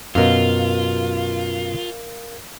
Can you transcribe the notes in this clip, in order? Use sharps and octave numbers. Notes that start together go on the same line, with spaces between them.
F#2 B2 F4 A#4 F5